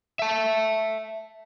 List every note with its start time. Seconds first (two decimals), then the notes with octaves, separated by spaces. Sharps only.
0.19 E5 A5